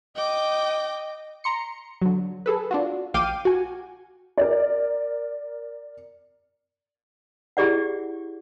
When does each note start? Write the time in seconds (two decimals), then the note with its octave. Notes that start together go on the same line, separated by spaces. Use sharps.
0.16 D#5 G5 D6
1.44 A#5 C6 C#7
2.02 D3 F#3
2.46 G#4 A4 B4
2.71 D4 F4 F#4
3.14 A#1 F5 G5 D6 G6 D#7
3.45 F#4 G#5
4.38 A#4 D5
7.57 E4 G4 G#4 D5 F#5